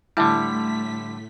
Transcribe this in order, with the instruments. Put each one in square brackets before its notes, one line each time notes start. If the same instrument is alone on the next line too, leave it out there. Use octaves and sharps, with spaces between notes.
[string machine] A2 A3 B6 [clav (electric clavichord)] D3 G3 [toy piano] E4 E5 A5